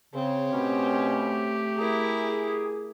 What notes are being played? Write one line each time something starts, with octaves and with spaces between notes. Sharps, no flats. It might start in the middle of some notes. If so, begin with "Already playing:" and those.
C#3 C4 C#5
B2 A3 C#4 G4
E4 G#4 A#4